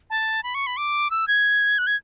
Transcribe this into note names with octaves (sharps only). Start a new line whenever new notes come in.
A5
B5
C#6
B5
D6
E6
G#6
F#6
G#6